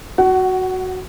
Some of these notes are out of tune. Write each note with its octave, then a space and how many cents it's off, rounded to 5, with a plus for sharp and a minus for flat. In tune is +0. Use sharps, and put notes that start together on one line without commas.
F#4 +0 F#5 +25